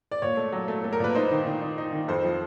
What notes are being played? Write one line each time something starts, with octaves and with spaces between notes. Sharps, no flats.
D5
A#2 C#5
A3
F#3
A3
A3
A#4
A#2 B4
D#4 C5
D#3
D#3
D#4
D#4
D#3
F2 C5
F3